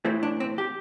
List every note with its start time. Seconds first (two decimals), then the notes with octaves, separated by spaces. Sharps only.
0.05 A2 E3 A3 C4
0.23 D4
0.40 C4
0.58 G4